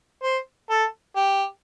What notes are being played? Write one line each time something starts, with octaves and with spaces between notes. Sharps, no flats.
C5
A4
G4